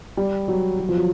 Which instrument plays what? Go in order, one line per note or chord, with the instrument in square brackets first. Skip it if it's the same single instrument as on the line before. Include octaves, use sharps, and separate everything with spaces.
[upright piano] G3
F#3
F#3
F3
F#3